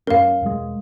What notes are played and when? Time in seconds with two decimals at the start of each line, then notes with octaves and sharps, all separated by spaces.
0.07 F#2 A#3 C#4 A#4 F5
0.43 E1 G#3